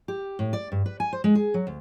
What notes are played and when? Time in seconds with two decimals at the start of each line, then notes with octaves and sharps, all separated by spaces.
0.08 G4
0.39 A2
0.53 D5
0.72 G2
0.86 B4
1.00 G#5
1.13 C5
1.24 G#3
1.35 G#4
1.54 F#3
1.67 D2